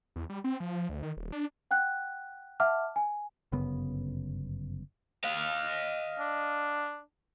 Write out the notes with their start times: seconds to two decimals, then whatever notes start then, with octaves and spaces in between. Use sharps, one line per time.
0.16 E2
0.29 G3
0.44 C4
0.60 F3
0.72 F3
0.89 D2
1.03 D#3
1.17 D#1
1.32 D4
1.71 F#5 G5 F#6
2.60 E5 F#5 A5 D6 F6
2.96 G#5
3.52 G1 F#2 C#3 B3
5.24 D#5 F5
6.19 D4